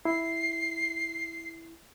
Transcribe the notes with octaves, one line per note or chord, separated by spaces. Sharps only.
E4 C7